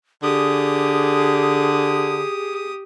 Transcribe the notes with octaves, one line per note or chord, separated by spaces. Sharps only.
D3 G4 G#4 D#6